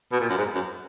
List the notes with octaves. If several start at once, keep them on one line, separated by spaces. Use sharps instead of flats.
B2
A#2
F#2
G#2
F#2